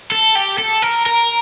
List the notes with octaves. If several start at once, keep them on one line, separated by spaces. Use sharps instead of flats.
A4
G4
A4
A#4
A#4